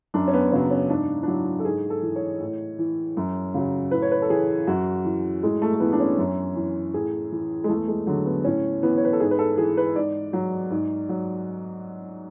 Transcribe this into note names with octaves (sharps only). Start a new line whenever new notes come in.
F#2 D4
C#4
B3
C#3 F#3 C#4
C#4
G#2 D4
D4
F#3 E4
A4
G#2 G#4
A4
E3
C#5
A2
E3
F#2
C#3 F#3
A2 B4
C#5
B4
A4
E3 G#4
F#2 F#4
E3
A2 G#3
A3
A3
E3 B3
D4
C#4
F#2
E3
A2 G#4
E3
G#3
E2 A3
G#3
D3 F#3
B3
A2 C#4
E3 B3
C#5
B4
A4
G#2 G#4
B4
A4
E3 G#4
B4
G#2 D5
F#3
G#2
F#3